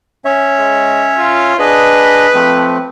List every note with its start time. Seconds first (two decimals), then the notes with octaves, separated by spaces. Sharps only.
0.25 C#4 C#5 E5
0.59 G#3
1.18 F4
1.59 D4 G#4 B4 D#5
2.34 F3 A3 C4